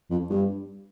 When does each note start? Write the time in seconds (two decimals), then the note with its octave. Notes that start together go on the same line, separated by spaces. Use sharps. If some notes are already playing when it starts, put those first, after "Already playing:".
0.10 F2
0.30 G2